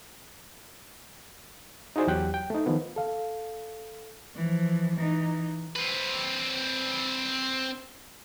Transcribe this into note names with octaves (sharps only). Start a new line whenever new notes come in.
D#4 E4 F#4 G#4 C5 D5
E2 F#3 G4 G5 F#6
G5
A3 D#4
D#3 F3 B3
A4 F5
E3 F3
E3 D#4
C4 B4